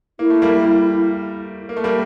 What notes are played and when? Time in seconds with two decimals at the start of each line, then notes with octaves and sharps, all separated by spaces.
0.19 A#3 E4
0.30 A3
0.42 G3 A#3
1.69 A#3
1.77 A3
1.84 G3 A#3